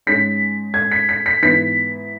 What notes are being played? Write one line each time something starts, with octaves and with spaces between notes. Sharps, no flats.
G#2 G#3 C#4 B6
G#6
B6
B6
B6
G#2 E3 B3 B6